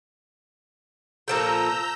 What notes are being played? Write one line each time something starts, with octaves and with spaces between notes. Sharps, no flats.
A#2 F3 A4 A#5 E6 G6